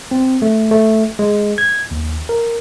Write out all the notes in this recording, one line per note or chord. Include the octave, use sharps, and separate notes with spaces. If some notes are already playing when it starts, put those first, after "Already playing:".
C4
A3
A3
G#3
G#6
D#2
A#4